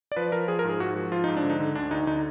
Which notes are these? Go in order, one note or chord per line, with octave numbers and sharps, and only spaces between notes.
D5
F3 B4
F3 A#4
F3 G#4
A#4
G#2 G#4
G#2 F#4
F3 F#4
F3 F4
G#2 D#4
D4
D3
D#4
D3
D2 D4
D2 D#4
D3 D#4